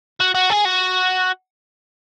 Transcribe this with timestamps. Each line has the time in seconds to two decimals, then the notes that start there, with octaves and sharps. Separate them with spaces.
0.20 F#4
0.35 F#4
0.50 G#4
0.65 F#4